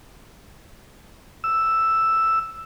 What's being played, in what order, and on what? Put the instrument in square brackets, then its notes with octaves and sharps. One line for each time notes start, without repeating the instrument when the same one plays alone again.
[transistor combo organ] E6